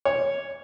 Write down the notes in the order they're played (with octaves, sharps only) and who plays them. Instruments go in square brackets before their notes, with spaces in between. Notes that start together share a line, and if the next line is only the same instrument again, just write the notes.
[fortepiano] C#5